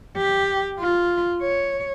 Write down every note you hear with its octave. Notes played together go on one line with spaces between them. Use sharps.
G4
F4
C#5